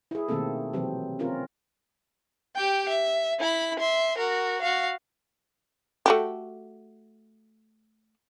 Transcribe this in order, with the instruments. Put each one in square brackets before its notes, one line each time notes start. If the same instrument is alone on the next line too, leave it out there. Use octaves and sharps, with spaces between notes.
[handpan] E4 G#4
B2 D#3 A3 A#3 C4 A4
C3 E3 F#3 C4
C4 C#4 F4 A#4
[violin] G4 G5
E5
E4 B5
E5 C6
F#4 A#4
F#4 F5
[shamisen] A3 F#4 G4